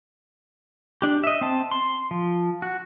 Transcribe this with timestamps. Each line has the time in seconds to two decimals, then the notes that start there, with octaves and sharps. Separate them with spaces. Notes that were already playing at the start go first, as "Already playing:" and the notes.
1.02 D4 G4
1.24 D#5 E5
1.41 C4 A5
1.71 C6
2.11 F3
2.62 F#4